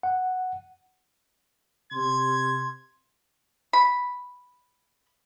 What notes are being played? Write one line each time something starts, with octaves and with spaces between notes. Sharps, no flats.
F#5
C3 C6 G#6
B5